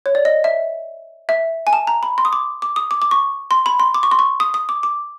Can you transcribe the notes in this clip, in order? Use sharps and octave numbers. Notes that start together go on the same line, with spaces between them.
C#5
D5
D#5
E5
E5
G#5
A5
A#5
B5
C6
D#6
D6
D6
D#6
D6
D6
C#6
C6
B5
C6
D6
C#6
C6
C#6
D#6
D#6
D6
D6